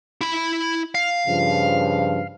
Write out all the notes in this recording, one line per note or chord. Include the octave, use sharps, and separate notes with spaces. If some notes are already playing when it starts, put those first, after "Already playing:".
E4 B5
F5
G2 C#3 F3